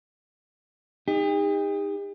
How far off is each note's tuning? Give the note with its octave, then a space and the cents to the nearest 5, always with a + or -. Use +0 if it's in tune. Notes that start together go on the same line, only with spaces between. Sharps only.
D#4 +0 G4 +45